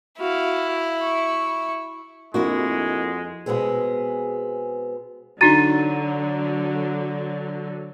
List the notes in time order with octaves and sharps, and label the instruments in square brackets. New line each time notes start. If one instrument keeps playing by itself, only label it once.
[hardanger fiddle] E4 [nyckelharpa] F#4 F5
[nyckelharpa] C#6
[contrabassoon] F2 [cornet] G#3 [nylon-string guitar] A#3 D4 E4 [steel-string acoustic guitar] F#4
[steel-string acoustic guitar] B2 G#3 B3 C4 G#4
[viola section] D3 F#3 [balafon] D4 D#4 F#4 [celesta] A#5 A6 D#7